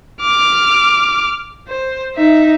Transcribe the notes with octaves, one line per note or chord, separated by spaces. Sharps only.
D6 F6
C5
D#4 E5